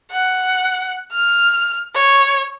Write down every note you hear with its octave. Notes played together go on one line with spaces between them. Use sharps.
F#5
F6
C#5